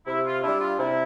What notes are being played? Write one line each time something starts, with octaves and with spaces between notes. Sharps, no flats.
C3 E4
F4
G3 D4 E4
F4
C3 E4